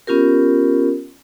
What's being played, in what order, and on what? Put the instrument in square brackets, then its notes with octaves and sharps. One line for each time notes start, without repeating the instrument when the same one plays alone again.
[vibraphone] B3 C#4 F4 G4 A#4